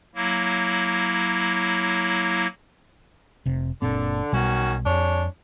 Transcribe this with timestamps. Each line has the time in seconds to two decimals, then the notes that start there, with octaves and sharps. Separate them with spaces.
0.15 F#3 A#3 E4
3.45 F1 C3
3.82 F#1 A#2 D3 C4
4.32 B1 B2 D#3 G3 C#4 F#4
4.86 F2 G#3 D4 C#5